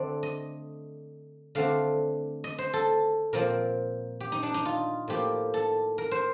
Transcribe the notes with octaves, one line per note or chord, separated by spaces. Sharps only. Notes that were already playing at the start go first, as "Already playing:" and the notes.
Already playing: D3 A3 C4 D5
D#5
D3 A3 C4 F5
D#5
C5
A4
A#2 F3 C4 A#4
G4
D#4
D4
D#4
F4
A2 F3 A#3 G4
A4
A#4
C5